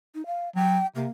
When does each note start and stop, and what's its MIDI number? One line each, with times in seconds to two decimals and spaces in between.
0.15 0.26 63
0.26 0.49 77
0.55 0.80 54
0.55 0.87 79
0.96 1.07 48
0.96 1.10 58